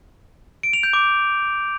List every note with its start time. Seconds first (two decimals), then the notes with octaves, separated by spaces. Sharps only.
0.63 D7
0.73 F7
0.83 G6
0.93 D6